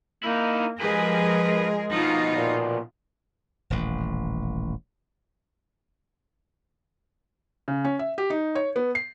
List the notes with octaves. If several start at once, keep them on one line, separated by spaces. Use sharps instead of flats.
A#3 D#4 E4
F3 G#3 G4 G#4 A#4 B4
B2 F3 D#4 F4
A#2
D#1 A1
C#3
C#4
E5
G4
D#4
C#5
B3
C7